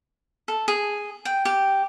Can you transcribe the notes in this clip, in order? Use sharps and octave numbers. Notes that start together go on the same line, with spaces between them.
A4
G#4
G5
G4